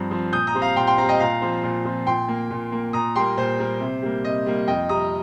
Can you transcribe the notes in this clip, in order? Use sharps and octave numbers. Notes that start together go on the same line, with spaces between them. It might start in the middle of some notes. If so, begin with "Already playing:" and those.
Already playing: G2 F3 C4 A#5
F3 C4
A#2 D#6 G6
A#5 D#6
G3 C4
F5 A#5
A#2 G5 C6
G5 C6
G3 C4 F5 A#5
D#5 G5
A#2 F5 A#5
F3 C4
A#2
F3 C4
A#2 G5 C6
A#3
A#2
A#3
A#2 A#5 D#6
G3 A#3 G5 C6
A#2 C5
G3 A#3
C3
G3 A#3
C3 D#5
G3 A#3
F2 D#5 G5
C3 G3 A#5 D#6